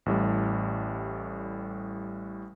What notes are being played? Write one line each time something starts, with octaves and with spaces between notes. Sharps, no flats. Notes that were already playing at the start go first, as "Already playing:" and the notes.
A1 A2 G3